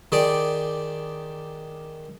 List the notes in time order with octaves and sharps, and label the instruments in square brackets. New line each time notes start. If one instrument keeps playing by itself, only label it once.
[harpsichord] D#3 G4 G#4 D5